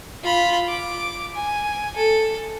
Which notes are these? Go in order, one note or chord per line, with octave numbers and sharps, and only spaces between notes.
F4 B5
D6
G#5
A4